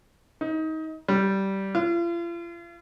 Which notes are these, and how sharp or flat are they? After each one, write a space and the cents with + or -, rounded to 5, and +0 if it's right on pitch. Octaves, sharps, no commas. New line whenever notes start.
D#4 +25
G3 -15
F4 -40